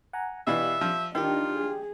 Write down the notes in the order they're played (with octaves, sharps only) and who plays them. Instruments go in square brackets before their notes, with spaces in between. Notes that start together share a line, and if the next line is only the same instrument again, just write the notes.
[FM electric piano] F#5 G#5 A#5
[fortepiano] B2 E3 [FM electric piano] G4 D5 F5 [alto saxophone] E5
[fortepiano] F3
[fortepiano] D#3 [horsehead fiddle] D4 D#4 [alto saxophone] F4 [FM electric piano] G4 G5
[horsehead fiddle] G#4